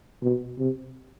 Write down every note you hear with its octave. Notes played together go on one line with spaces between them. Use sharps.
B2
C3